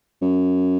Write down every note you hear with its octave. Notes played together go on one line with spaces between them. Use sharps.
F#2